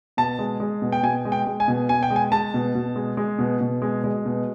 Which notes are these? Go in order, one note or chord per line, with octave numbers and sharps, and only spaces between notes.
B2 A5
G#3
G#3
B2
G5
B2 G#5
G#3
G5
G#3
G#5
B2
B2 G#5
G5
G#3
G#5
G#3 A5
B2
B2
G#3
G#3
B2
B2
G#3
G#3
B2